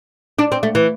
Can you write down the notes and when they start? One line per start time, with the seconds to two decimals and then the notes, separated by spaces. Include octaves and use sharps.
0.39 D4
0.52 C4
0.63 A3
0.75 E3